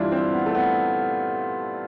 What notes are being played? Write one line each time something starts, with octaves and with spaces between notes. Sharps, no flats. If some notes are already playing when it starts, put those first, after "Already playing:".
Already playing: G2 E3 D4 E4 F4
C4
B3
A3
B3